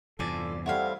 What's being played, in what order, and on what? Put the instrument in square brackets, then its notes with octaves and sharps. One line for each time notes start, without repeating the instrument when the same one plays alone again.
[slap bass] E2 G2 C3 [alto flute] F4 [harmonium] A4 [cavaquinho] D5 G#5
[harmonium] G3 A3 C4 [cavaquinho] E4 C#5 F5 [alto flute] F#5